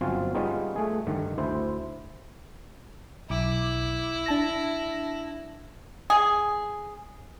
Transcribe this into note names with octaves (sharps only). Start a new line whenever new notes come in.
G1 F#3 C4 C#4 F4 F5
G3 G#3 B3 C#4 D#4 F4
A3 G#4
G2 D3 D#3
D2 E4 C5
B1 E4 D6
D4 A5 A#6
G#4